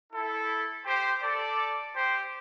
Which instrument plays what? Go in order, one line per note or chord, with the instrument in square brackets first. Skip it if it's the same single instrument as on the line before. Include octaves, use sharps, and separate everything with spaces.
[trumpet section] E4 A4
G4 C5
A4 D5
G4 C5